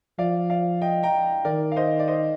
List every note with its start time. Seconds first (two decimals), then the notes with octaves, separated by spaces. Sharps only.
0.18 F3 D5 F5
0.50 D5 F5
0.82 D#5 G5
1.03 G5 A#5
1.45 D#3 A#4 D5
1.72 F5
1.76 C5 D#5
1.99 D5
2.08 C5 D#5